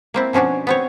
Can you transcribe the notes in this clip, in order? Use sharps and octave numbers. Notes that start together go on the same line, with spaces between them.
A#3 C4 E4
B2 F3 C#4 D4 F#4
B3 C4 C#5